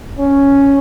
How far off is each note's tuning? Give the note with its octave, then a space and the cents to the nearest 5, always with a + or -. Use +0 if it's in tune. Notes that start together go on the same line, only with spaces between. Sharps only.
C#4 +0